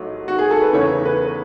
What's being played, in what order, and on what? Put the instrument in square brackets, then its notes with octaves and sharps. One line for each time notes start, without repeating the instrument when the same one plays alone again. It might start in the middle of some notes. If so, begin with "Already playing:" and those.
Already playing: [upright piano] A1 G#2 F#3 A3
F#4
G#4
A4
B4
E2 C#3 E3 A3 C#4 C#5
B4